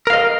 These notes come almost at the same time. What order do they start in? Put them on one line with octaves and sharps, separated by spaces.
A#4 F5 D#5